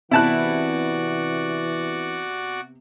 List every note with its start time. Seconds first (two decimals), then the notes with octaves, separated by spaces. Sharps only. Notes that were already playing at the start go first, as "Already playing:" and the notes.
0.11 C3 E3 B3 E4 F#4 D5 A5 F#6